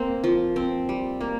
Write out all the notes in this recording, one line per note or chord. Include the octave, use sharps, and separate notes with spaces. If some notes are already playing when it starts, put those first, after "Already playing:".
Already playing: A#3 C4 C5
F3
C4
G3
A#3